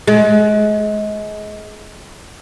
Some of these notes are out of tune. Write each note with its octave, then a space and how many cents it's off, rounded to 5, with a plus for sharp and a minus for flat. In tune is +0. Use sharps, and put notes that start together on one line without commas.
G#3 +30